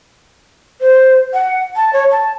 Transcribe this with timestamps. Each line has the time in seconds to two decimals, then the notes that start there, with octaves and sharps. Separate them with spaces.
0.81 C5
1.34 F#5
1.76 A5
1.93 C#5
2.11 A5